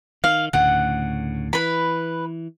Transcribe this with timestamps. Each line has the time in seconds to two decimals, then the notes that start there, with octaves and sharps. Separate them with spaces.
0.24 D#3 F5
0.53 D2 A2 C#3 F#5
1.53 E3 B4 B5